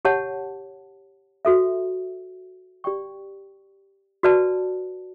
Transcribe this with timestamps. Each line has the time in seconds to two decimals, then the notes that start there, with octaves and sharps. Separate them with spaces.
0.05 G4 C#5 F#5 A5
1.45 F#4 A4 E5
2.84 G4 D5 G5 C#6
4.23 F#4 B4 D5 A5